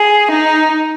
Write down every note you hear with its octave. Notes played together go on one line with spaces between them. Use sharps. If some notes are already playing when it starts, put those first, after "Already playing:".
Already playing: G#4
D#4